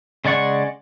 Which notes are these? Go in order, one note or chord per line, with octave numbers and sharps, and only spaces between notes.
C#3 G#3 D5 F#5 C#6